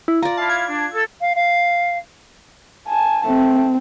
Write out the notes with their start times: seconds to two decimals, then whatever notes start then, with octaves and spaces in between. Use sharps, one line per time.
0.08 E4
0.23 F4 D5 A#5
0.37 E4 E5 F5 A5
0.50 G#6
0.68 D4
0.93 A4
1.21 F5
1.35 F5
2.88 G#5 A5
3.26 A3 C4